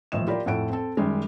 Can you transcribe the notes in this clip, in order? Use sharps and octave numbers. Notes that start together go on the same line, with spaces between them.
D#1 A1 A2 F3 D#5 E7
F4 G4 A#4 D5 B5
F2 A2 A4 F#5 D7
C4 A4
F#2 D#3 G3 G#3